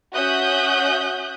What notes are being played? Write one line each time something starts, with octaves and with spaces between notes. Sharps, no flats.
C#4 F#4 E5 D#6 F#6 G6